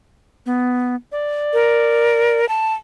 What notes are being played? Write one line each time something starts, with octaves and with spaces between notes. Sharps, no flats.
B3
D5
A#4
A5